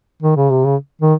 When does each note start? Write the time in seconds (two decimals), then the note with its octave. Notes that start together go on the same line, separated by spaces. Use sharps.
0.22 D#3
0.36 C#3
0.50 C3
0.64 C#3
1.01 D#3